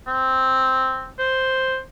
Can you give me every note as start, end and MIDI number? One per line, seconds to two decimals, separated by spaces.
0.07 1.09 60
1.18 1.78 72